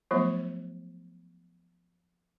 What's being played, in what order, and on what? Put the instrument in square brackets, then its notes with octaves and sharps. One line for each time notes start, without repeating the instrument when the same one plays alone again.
[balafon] F3 F#3 A3 B3 F4